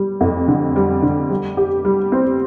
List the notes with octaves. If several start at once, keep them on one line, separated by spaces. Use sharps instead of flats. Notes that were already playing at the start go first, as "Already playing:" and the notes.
Already playing: G3
F2
D3
G3
D3
G3
G4
G3
C4